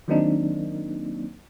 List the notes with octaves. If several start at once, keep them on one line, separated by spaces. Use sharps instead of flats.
D#3 F#3 A#3 C4 D4 D#4